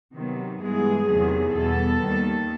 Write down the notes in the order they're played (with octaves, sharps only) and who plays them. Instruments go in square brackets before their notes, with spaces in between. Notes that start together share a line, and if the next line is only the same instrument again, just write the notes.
[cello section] C3 D#3 F#3 B3
G2 E3 G#3 B3 G#4
E2 C3 D#3 F#3 A3
E2 B2 G3 B3 A4
D#2 D#3 G3